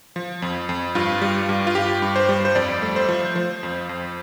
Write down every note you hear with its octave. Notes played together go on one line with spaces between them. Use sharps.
F3
F2
F2
G2 F4
G3
G2
F4
G2 G4
G2
C5
G3
C5
F2 D5
A3
C5
F3
F3 C5
F2
F2